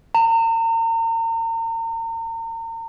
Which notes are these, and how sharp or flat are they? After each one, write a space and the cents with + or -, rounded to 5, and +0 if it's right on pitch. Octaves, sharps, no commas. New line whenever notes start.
A#5 -40